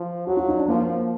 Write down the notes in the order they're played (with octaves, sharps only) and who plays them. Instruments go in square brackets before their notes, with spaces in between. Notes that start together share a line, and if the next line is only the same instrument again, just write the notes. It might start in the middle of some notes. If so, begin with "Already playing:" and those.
Already playing: [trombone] F3
[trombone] F#3 [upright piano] F#4
[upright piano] F4
D#4
D4
[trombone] F3 [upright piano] A#3